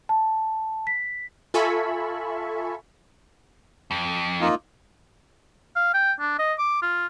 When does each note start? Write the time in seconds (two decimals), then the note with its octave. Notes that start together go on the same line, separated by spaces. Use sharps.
0.09 A5
0.87 B6
1.54 F4 A4 E5 G#5 B5 C#6
3.91 F2
4.41 A#3 D#4 F4
5.76 F5
5.94 G5
6.20 D4
6.39 D#5
6.58 D6
6.82 F4